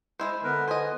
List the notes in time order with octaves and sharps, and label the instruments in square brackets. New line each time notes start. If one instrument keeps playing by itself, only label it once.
[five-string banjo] G#3 E4 C5
[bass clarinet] D3 [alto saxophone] B3 [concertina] A#4 B4
[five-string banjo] C5 D#5 [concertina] G#5